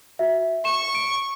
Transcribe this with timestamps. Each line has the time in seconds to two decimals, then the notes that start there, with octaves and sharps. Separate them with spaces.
0.19 F#4 E5
0.65 C#6 E7
0.95 D7